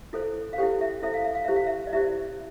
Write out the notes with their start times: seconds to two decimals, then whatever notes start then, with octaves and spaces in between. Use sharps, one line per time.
0.13 E4 A4 C5
0.53 F5
0.58 E4 G4 A4 C5 G5
0.81 E5
1.03 E4 A4 C5 E5
1.14 F5
1.24 E5
1.35 F5
1.45 E4 G4 C5 E5
1.56 F5
1.67 E5
1.87 D5
1.93 E4 G4 C5 E5